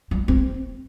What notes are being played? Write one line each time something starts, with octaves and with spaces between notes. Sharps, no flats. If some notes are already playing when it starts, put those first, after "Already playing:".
G3
C4